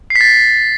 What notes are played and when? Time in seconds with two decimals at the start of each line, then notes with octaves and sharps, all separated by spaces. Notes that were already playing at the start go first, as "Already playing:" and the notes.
0.10 C7
0.16 B6
0.21 A6